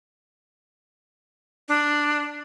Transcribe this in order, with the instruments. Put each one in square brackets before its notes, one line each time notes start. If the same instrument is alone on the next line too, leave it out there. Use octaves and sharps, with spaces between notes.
[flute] D4